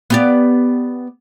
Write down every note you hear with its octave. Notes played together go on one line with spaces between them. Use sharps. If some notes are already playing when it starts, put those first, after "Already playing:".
B3 G4 D5